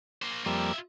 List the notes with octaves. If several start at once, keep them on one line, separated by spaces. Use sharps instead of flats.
A#3 C5
F2 G3 A#3 F4 E5